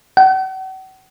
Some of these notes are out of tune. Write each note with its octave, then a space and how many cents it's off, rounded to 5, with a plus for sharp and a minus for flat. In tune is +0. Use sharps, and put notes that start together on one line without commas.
F#5 +40